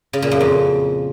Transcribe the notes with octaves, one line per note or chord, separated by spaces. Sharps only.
C#3
A#2
F#2
F2